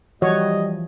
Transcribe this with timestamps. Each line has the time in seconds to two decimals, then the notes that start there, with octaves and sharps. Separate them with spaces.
0.22 E3 F3 G3 F#4 C#5 D#5